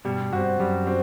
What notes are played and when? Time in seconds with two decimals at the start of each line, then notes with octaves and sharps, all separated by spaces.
0.05 G2 B2 G3
0.32 G2 C4 F#4
0.59 F#2 G3
0.87 C4 F#4